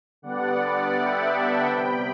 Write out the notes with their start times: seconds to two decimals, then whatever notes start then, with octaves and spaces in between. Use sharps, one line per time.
0.22 D3 G3 B3 D5 F#5
0.58 D5 F#5
0.95 E5 G5
1.31 F#5 A5
1.67 C3 G3 B3 G5 B5